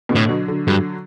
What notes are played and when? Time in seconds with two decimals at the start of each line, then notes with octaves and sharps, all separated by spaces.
0.09 B2 D3
0.15 A2
0.28 D3 F#3
0.48 D3 F#3
0.67 G2 D3 F#3